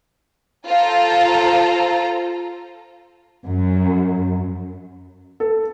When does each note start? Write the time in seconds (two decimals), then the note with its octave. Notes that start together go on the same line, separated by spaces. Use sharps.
0.67 F4 A4 C5 A#5
3.47 F#2
5.40 A4